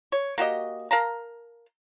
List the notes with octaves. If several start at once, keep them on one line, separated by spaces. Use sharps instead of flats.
C#5
A#3 F#4 G4 D#5
A#4 F5 A5 A#5